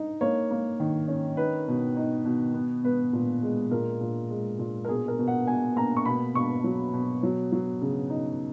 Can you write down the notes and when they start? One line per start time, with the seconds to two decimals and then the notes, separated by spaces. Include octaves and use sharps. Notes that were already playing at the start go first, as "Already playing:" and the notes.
Already playing: D#4
0.21 A#3 C#5
0.51 A#3
0.80 D#3
1.08 C#4
1.37 D#4 B4
1.68 B2
1.97 D#4
2.25 B2
2.54 B3
2.84 B3 B4
3.13 A#2
3.42 G#3
3.71 A#2 A#4
4.01 A#2
4.30 G#3
4.59 A#2
4.85 A#4
4.88 B2 G#4
5.08 A#4
5.18 B2
5.28 F#5
5.47 B2 G#5
5.76 A#3 A#5
5.97 C#6
6.06 B2 B5
6.34 B2 C#6
6.64 F#3
6.93 B2
7.23 F#3
7.52 F#3
7.82 C#3
8.10 D#4